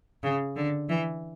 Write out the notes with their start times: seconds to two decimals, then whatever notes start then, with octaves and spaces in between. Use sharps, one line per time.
0.23 C#3
0.56 D3
0.89 E3